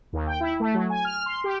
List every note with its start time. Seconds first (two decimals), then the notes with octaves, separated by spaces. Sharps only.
0.13 D#2
0.27 G5
0.40 E4
0.60 A3
0.74 F#3
0.90 G#5
1.05 F6
1.26 C6
1.44 G4